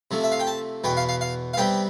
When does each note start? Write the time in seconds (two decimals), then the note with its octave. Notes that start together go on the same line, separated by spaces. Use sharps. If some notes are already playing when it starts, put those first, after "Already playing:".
0.11 C3 F3 A3
0.24 E5
0.32 F5
0.40 G5
0.47 A5
0.84 E2 B2 B3 G5
0.97 F5
1.09 F5
1.21 F5
1.54 F5
1.57 C3 G3 B3 G5